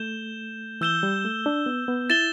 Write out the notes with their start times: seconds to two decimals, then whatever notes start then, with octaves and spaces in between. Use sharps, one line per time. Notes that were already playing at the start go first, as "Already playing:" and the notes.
Already playing: A3 G6 E7 G7
0.81 E3 E6 G6 E7 G7
1.03 G3
1.25 A3
1.46 D4
1.66 B3
1.88 B3
2.10 E4 A6 E7 G7